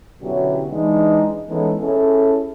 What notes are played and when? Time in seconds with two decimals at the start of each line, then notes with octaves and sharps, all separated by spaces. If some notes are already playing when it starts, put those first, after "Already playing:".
0.21 B2 D3 F#3 C#4 E4 G4
0.72 E3 G#3 D4 D#4
1.48 E3 G#3 B3 C#4 D#4 A4
1.80 C#4 E4 G#4 A4